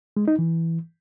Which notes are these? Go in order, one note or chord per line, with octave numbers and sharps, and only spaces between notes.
G#3
D#4
E3